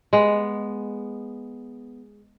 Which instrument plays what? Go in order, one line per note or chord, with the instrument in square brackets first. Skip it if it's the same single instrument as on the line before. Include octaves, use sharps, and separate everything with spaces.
[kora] G#3 B3